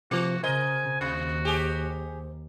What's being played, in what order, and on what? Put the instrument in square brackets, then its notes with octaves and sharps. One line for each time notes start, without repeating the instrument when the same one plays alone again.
[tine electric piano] C3 F3 [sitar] A3 [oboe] F#4
[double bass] C#3 [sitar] A#4 D#5 [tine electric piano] C5 [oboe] G#5
[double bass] D#2 [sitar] C3 [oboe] F#4
[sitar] G4 G#4